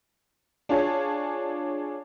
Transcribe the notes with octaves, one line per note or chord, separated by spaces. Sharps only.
D4 F4 G#4 C#5 A5